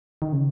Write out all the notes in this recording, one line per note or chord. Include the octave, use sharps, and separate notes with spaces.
D#3
C#3